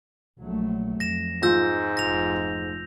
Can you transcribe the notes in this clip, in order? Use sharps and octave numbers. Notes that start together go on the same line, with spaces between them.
A#1 F#3 A3
F2 A#6 E7
G#2 F4 E6 G6 A#6
F1 F3 A#6 F7